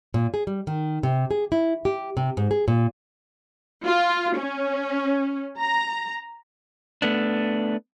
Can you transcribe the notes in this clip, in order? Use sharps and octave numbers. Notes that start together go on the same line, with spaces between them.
A#2
G#4
G3
D#3
C3
G#4
E4
G4
C3
G#2
G#4
A#2
F4
C#4
A#5
A3 B3 D4